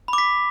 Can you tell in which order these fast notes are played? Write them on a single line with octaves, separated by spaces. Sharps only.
B5 D6 B6